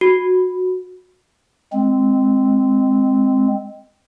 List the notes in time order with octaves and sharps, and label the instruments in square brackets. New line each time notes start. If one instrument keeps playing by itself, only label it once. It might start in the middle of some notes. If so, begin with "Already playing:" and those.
[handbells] F#4
[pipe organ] G#3 C4